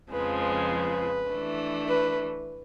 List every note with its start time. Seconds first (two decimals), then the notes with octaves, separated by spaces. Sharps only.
0.12 F2 C#3 F3 G#3 B4
0.41 B4
1.30 E3 A3 D4
1.88 B4